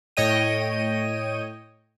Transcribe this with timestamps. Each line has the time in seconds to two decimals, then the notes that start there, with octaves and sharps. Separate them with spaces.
0.17 A2 C#5 D#5 G5 D#7